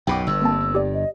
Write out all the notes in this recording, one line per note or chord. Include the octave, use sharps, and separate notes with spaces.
B1 F#2 B2 G5 B5 D6
G1 G2 E6
A#3 C4 A5
G4 D5
D#5